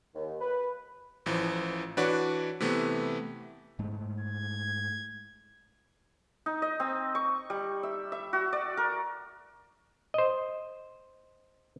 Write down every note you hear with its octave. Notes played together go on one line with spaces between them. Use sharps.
D#2
B4
A1 E3 F3
E3 D4 F#4 B4 C#5 D5
C3 E3 A3 B3
G#2 G#3 A3
G#6
D#4
D#5
C4
C#6
G3
E5
E5
F#4
D5
A#4
C5 D#5